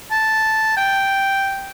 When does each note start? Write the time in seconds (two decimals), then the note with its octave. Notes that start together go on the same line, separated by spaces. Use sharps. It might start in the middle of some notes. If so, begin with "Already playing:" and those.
0.11 A5
0.77 G5